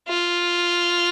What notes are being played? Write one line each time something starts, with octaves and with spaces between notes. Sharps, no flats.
F4